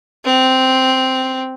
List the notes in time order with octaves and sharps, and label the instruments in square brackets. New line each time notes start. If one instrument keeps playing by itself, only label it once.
[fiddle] C4